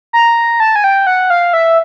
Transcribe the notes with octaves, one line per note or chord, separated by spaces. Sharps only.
A#5
A5
G#5
G5
F#5
F5
E5